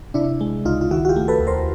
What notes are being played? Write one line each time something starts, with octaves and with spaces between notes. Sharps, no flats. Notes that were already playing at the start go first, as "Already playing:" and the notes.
C3 D4 E4
G#3
C#2 D#4 F4
F4
D#3 E4 F#4
F#4
F4 G4
A3
A4 B4
D#2
A#4 C5